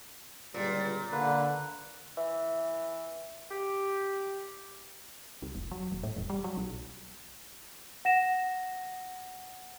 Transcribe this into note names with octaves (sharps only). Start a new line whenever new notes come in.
G1 C#2 A#2 G3
D3 A#3 B4
E3
G4
C2
F1
F#3
D#1
A2
E1
G3
F#3
B1
F#5 A#6 E7